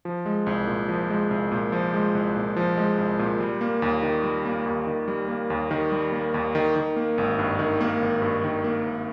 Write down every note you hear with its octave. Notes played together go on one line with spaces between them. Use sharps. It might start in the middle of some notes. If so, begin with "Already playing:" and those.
F3
G#3
C2
A#2
F3
G#3
C2
A#2
F3
G#3
C2
A#2
F3
G#3
C2
A#2
G3
A#3
D#2
D#3
G3
A#3
D#2
D#3
G3
A#3
D#2
D#3
G3
A#3
D#2
D#3
D#3
A#3
G#1
G2
D#3
A#3
G#1
G2
D#3
A#3
G#1